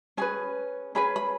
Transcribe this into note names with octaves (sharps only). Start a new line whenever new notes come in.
C#4 G#4 B4 G#5
C#4 G#4 B4 B5
B5